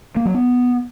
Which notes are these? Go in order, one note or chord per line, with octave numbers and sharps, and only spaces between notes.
A#3
F#3
B3